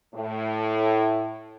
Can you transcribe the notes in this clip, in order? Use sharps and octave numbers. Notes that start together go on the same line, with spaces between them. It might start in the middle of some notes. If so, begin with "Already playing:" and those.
A2